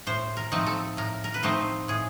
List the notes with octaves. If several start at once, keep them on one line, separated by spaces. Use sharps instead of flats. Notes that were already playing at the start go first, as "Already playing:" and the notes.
A2 C5
A#4
F3 A3 C4 D#4
A4
A2 A#4
A#4
B4
F3 A3 C4 D#4 C5
A2 G#4